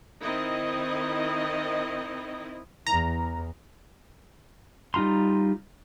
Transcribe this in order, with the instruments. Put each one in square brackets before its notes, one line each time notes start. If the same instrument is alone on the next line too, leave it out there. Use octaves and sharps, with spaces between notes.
[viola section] D#3 C4 D#4 E4 D#5
[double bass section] E2 [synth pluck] A#5
[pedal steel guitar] G3 D#4 F4 A#5 C6